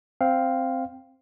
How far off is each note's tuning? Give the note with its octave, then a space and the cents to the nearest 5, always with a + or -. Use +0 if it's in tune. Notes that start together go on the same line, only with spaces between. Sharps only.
C4 +0 F5 +0